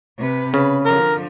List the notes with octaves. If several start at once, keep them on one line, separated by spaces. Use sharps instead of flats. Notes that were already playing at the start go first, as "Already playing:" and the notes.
C3 B4
C#3 B4
D3 F3 A#4